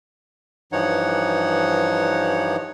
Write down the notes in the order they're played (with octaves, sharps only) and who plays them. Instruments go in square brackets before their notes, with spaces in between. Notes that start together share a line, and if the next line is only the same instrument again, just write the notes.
[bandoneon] G2 E3 F3 D#4 C#5 F#5